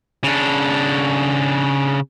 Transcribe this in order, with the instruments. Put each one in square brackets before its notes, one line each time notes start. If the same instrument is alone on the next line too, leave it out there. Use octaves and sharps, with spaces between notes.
[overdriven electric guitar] C#3 D4